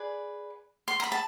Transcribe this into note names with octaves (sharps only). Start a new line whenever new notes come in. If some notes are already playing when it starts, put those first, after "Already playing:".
Already playing: G#4 B4 D5
C6
A#5
B5
A5